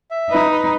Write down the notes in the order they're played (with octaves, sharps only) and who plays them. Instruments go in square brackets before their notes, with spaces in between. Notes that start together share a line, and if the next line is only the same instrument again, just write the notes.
[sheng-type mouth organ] E5
[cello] D#4 [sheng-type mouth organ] B4
[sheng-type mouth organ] B4